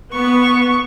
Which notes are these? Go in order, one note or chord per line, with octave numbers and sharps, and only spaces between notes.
B3 C#6